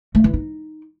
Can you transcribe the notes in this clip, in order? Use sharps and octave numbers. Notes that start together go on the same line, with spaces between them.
A3
E3
D#4